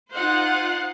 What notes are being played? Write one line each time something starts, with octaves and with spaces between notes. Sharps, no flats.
D#4 F4 C5 F5 F#5